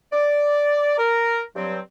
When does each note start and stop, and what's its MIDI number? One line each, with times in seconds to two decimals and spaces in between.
0.12 0.95 74
0.97 1.42 70
1.55 1.78 43
1.55 1.78 54
1.55 1.78 60